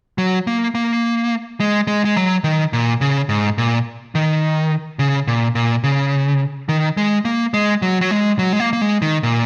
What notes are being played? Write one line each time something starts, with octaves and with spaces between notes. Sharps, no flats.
F#3
A#3
A#3
G#3
G#3
G#3
F#3
D#3
A#2
C#3
G#2
A#2
D#3
C#3
A#2
A#2
C#3
D#3
G#3
A#3
G#3
F#3
F#3
G#3
F#3
G#3
A#3
A#3
G#3
D#3
A#2